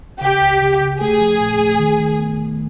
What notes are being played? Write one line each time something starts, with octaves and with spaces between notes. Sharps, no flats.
C#3 G4
C#2
C#3
C#3
A3 G#4
F3
A#2
A3
D#3
D#3
B3
D#3